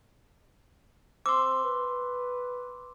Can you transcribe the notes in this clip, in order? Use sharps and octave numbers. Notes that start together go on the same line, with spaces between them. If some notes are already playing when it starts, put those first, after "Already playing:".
C4 C6 D6 E6
B4